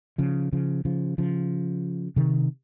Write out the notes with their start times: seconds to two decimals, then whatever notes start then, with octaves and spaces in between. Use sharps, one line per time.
0.18 C#3 F3
0.53 C#3 F3
0.85 C#3 F3
1.18 C#3 F3
2.16 C3 D#3